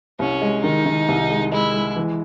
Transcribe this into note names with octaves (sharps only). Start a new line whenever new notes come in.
C2 C#4
G#3
D#3 D#4
D#3
C2
G#3
G#3 E4
G#3
E3